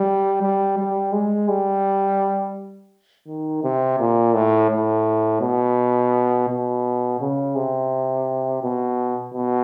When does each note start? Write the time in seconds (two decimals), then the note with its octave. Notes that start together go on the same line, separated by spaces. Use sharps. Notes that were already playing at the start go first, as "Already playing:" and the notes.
Already playing: G3
0.42 G3
0.78 G3
1.13 G#3
1.48 G3
3.27 D#3
3.64 C3
3.99 A#2
4.34 A2
4.71 A2
5.41 B2
6.49 B2
7.20 C#3
7.55 C3
8.62 B2
9.34 B2